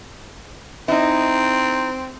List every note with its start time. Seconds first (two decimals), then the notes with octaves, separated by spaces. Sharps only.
0.88 C4 D#4 E4